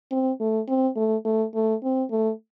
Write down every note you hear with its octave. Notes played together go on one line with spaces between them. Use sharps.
C4
A3
C4
A3
A3
A3
C4
A3